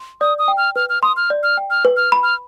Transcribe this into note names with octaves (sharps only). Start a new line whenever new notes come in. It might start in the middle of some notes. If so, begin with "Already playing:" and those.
Already playing: C6
D5 D#6
D#6
G5
F6
B4 F6
F6
C6 D#6
F6
D5
F6
G5
F6
B4
F6
B5
F6